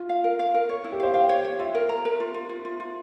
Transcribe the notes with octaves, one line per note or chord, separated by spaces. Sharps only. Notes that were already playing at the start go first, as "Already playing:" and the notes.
Already playing: F4
F5
A#4
F5
A#4
C#5
E4
G4
C5 F5
F5 G5
C#5
C#5
F4 E5
A#4
A#5
A#4
F4
F4
F4
F4
F4